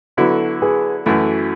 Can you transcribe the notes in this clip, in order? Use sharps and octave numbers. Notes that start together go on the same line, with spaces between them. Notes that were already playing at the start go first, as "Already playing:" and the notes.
D3 F#3 B3 E4 F#4 A4
G#4 B4
F#2 E3 A3 E4 F#4 A4